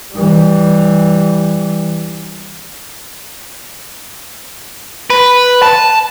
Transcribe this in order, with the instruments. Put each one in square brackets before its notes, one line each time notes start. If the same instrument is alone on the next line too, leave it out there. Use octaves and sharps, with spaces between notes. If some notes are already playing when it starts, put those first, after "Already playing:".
[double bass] E3 G3
[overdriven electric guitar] B4
A5